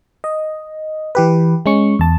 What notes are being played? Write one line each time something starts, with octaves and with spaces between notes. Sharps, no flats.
D#5
E3 G4 B4
G#3 C#4 C#6
E2 A5